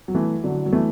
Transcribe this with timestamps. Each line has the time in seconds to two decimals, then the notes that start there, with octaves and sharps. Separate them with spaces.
0.08 F#3
0.14 E3 A3
0.44 D3 F#3
0.66 F#3
0.73 E3 A3